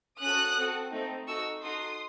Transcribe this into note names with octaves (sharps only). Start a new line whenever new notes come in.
C#4 F#4 A4 D#6 F#6
C4 F#4 A4
A3 C4 D#4
D#4 F#4 A4 C#6 E6
D#4 F#4 A4 C6 D#6